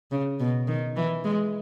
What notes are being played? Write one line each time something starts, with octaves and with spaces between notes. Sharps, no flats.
C#3
B2
D#3
E3
G#3